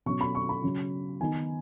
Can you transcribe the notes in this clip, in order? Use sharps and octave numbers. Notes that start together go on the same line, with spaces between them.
B2 F#3 C#4 C#6
B5
C#6
B5
C#3 F#3 C#4
D#3 B3 D#4 G#5